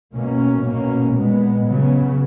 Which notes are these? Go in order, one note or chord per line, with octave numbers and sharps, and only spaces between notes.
B2 A#3 C#4
B2 A#3 C#4
A#2 G#3 B3
C#3 F#3 B3